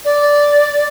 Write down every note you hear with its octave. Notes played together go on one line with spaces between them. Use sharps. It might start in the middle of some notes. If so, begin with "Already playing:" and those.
D5